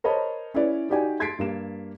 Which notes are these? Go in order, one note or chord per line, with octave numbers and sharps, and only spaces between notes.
A#4 C5 C#5 D#5 A5 B5
C#4 E4 B4 C#5 D5
D#4 F#4 G4 D5 G#5
C6 G#6 A6 B6 C7 D7
G2 A#3 E7